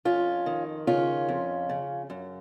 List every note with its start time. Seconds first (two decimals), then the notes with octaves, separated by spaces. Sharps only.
0.05 F2 C#4 F4
0.46 D#3
0.87 C#3 C#4 F4
1.29 F2
1.69 C#3
2.10 F#2